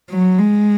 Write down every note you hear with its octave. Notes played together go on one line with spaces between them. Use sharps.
F#3
G#3